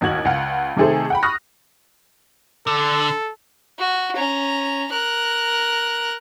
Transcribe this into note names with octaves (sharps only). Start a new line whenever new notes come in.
A1 D#2 F#4 G#6 F#7
C#2 F5 F#5
C3 D#3 A3 G#4 A4 C5
F#5 G5 B5
B5 C#6 D#6 F6 F#6 A#6
D3 A4
F#4
C#4 A#5
A#4 F#6